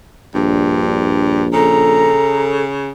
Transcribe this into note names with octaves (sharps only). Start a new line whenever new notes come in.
A#1 G2
C#3 A4 A#5